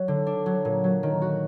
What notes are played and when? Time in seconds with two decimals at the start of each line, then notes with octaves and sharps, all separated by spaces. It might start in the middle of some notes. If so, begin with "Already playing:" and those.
Already playing: F#3
0.08 D3
0.27 D4
0.46 F#3
0.65 A#2
0.84 F#3
1.03 D#3
1.22 F#4